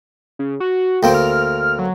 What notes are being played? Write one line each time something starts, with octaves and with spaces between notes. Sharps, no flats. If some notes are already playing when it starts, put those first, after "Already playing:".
C#3
F#4
D2 A#3 C4 G5
F6
F#3